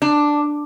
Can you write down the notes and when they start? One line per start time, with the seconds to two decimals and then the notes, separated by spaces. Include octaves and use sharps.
0.02 D4